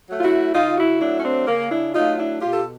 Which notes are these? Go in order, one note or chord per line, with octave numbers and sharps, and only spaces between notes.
F#3 A3
F4
E4 F#4
C#3 D#4 F4
E4 F#4
F#3 A3 D4 E4
C#4
C4 D4
C#3 A#3
D4 E4
F#3 A3 D#4 F4
D4 E4
B2 F4 G4
A4